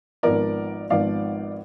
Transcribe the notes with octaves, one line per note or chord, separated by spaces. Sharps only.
G#1 G#2 F3 B3 A#4 D5
G#1 G#2 F3 B3 D5 F5